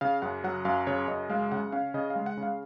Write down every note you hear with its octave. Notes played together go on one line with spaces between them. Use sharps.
C#3 F5
F#2 F#5
F#3 F#5
F#2 F5
C#3 C#5
F#2 D#5
G#3 F5
C#3 F#5
C#4 F5
C#3 D#5
F5
G#3
F#5
C#3
F5